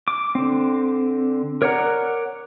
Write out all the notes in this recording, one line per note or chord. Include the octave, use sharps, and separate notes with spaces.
D6
D3 C4
A#4 C#5 D5 F#5 A#5